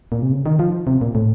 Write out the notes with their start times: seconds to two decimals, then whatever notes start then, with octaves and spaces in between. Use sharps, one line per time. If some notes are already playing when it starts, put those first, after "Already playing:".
0.12 A#2
0.22 C3
0.32 C#3
0.46 D#3
0.59 F3
0.87 C3
1.01 A#2
1.15 A2